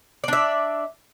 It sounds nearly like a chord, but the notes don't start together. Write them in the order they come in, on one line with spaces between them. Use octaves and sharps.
D5 D4 E5